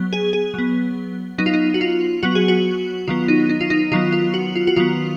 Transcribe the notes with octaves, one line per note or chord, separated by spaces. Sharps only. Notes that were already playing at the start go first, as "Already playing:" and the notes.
Already playing: F#3 B3
G#4
G#4
F#3 B3
F#3 B3 D#4
F4
D#4
F#4
F4
F#3 B3 F#4
G#4
F#4
D#3 F#3 B3 F4
D#4
D#4
F4
D#4
D#3 F#3 B3 F4
F4
F#4
F4
F#4
D#3 F#3 B3 F4